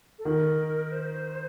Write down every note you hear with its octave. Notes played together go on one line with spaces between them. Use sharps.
A4
D#3 A#4
C5